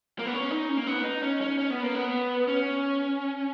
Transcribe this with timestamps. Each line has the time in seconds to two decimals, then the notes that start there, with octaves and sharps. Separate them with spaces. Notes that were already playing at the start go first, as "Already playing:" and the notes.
0.19 A#3
0.26 B3
0.33 C#4
0.51 D#4
0.69 C#4
0.77 A#3
0.87 B3
1.04 D#4
1.22 C#4
1.41 C#4
1.58 C#4
1.70 B3
1.83 A#3
1.95 B3
2.48 C#4